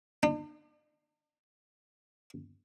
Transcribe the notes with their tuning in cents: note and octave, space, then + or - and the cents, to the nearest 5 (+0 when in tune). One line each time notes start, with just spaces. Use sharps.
D4 +45